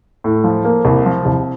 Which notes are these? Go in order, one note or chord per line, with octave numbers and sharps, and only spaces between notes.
A2
F3
A#3
C2
F3
C2